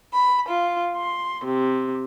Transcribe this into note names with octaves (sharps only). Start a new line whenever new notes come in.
B5
F4
C6
C3